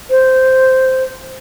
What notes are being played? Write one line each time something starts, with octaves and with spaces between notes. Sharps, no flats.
C5